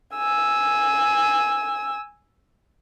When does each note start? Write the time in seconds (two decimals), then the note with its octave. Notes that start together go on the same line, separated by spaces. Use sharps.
0.15 G#5 E6